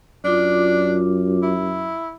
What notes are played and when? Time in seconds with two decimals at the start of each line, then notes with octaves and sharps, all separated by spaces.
0.24 F#2 D4 F4 D6
1.43 E4